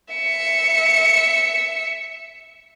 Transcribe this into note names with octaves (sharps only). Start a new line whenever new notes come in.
E5 C#7